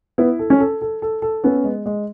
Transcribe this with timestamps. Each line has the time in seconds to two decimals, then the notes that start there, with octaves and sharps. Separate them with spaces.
0.18 B3 E4
0.39 A4
0.50 C#4
0.60 A4
0.81 A4
1.02 A4
1.22 A4
1.44 B3 C#4
1.64 G#3
1.86 G#3